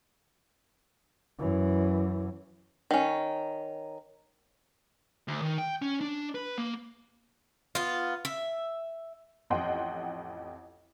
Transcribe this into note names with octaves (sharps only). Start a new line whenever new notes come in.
F#2 E3
D#3 C#4
D2
D#3
G5
C#4
D4
B4
A#3
B3 F4
E5
A1 F2 D#5 F#5 G5 C6